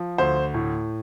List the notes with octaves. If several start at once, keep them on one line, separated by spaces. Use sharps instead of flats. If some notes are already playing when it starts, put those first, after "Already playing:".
Already playing: F3
D2 C5
A2